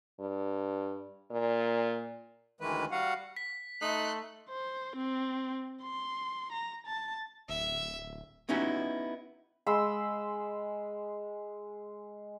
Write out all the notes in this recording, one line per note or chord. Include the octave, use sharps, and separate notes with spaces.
G2
A#2
D2 D#3 E3 G#3 B4
G3 F#4 F5 F#5
B6
A3 D#4 C6 F#6
C5
C4
C6
A#5
A5
D1 E5
B3 C#4 D#4 E4 F#4 G4
G#3 B5 C6 E6